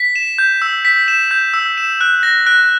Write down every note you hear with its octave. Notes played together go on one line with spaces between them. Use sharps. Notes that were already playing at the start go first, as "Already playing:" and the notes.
Already playing: B6
E7
G6
E6
B6
E7
G6
E6
E7
F#6
A#6
F#6